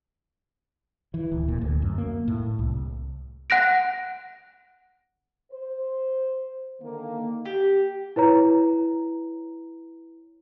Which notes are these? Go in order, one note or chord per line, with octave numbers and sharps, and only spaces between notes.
E3
D1
A#2
D2
F#2
A#3
A2
C2
F#5 F#6 A#6 D7
C5
D3 D#3 A#3
G4
E4 B4 C#5 A#5